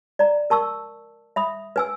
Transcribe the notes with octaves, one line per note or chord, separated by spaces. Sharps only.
D5 A#5
A#4 A5 C#6 E6
E5 B5 D#6
B4 G#5 E6